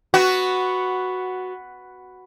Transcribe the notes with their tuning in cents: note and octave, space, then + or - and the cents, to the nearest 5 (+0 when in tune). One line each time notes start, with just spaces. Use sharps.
B3 +5 F#4 +0